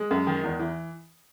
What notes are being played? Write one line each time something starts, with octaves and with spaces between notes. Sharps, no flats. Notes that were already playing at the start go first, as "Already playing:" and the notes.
Already playing: G#3
F#2
D#3
E2
E3